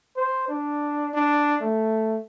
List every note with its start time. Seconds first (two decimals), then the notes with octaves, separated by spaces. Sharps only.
0.16 C5
0.49 D4
1.14 D4
1.61 A3